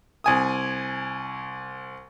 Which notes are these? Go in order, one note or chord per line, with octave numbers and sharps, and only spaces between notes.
C2 G#5 D#6